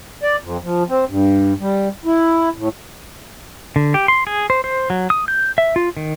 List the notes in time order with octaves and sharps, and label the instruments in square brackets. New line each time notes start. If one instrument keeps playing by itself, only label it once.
[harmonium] D5
F2
F3
C4
G2
G3
E4
A2
[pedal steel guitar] D3
G4
C6
G#4
C5
C5
F#3
D#6
G6
E5
F4
D#3